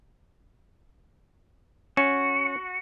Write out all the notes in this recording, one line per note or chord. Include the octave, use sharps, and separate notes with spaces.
C#4 F#4